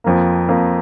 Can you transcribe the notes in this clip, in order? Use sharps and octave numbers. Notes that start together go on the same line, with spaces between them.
F2 F3 A#3
F2 F3 A#3